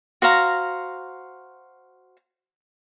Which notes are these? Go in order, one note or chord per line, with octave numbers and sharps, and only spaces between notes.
F#4 C5 F5 A#5